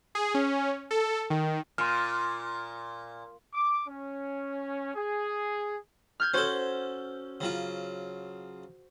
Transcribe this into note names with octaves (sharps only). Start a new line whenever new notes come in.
G#4
C#4
A4
D#3
A#2 C6 F6
D6
C#4
G#4
F6 G6 G#6
C#4 F#4 A4 C5 G#6
C#3 F#3 F4